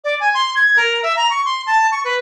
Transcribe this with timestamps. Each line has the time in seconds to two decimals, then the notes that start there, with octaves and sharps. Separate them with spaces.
0.04 D5
0.20 G#5
0.34 C6
0.55 G#6
0.76 A#4
1.03 E5
1.16 A#5
1.30 C#6
1.45 C6
1.67 A5
1.92 C#6
2.04 B4